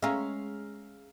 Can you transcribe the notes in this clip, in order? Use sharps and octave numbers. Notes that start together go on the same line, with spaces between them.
G#3 C#4 E5 F5 A#5